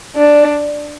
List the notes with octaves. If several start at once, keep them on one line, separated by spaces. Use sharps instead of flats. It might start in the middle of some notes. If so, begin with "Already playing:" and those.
D4